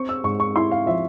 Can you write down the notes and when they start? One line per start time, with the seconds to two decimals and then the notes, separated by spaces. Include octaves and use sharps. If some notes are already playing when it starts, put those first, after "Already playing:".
Already playing: C4 C#6
0.09 E6
0.24 G#2 C#6
0.40 C#6
0.56 E4 C6
0.71 F5
0.86 F3 E5